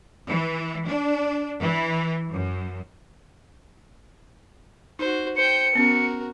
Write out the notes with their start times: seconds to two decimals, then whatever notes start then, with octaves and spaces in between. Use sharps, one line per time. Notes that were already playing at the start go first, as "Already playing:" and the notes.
0.28 E3
0.87 D4
1.60 E3
2.31 F#2
4.99 D#4 F#4 C5
5.37 C5 G5 C#7
5.75 B3 C#4 F#4 A#4